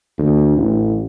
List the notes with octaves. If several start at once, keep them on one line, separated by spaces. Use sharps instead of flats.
D2
A1